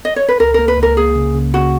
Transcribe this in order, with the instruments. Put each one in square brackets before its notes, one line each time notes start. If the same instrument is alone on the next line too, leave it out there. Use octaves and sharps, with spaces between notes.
[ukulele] D#5
C#5
B4
[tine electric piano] C#2 [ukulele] A#4
[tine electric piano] A#3 [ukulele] A#4
[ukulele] B4
[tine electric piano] C#2
[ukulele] A#4
[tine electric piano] A#3 [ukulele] G#4
[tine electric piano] C#3
C#3
[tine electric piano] C#3 [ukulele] F#4